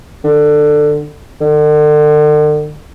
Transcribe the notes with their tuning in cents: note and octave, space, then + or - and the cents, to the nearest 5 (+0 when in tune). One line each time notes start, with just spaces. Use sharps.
D3 +20
D3 +40